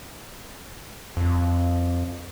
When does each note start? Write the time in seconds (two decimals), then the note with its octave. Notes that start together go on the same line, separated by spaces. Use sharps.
1.17 F2